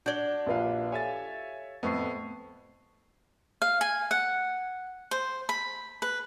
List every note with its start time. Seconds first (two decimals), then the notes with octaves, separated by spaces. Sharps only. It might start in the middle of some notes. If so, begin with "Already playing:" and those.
0.06 D4 F#4 D5 G6 G#6 G7
0.46 A#1 F4 G4 B4 F5
0.92 G4 A4 C#5 E5 F5 G#5 A6
1.83 F2 A2 B3 C5 C#6 C7
3.62 F5
3.81 G#5
4.11 F#5
5.11 C5
5.49 B5
6.02 B4